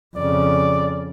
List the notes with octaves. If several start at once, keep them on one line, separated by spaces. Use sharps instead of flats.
F2 C#3 D5